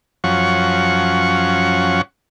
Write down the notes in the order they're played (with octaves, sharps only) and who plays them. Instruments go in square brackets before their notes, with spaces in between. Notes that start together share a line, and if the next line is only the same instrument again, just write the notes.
[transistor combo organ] F#2 F3 C#4 F#5 C#6